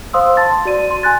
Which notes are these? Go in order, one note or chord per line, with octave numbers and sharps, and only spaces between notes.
C5 F5 C6 D#6 E6
A5 C6 A6
F#4 D5 D#7
C6
G#5 C6 F#6 A6